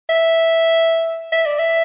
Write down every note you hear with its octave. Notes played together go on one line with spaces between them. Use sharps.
E5
E5
D5
E5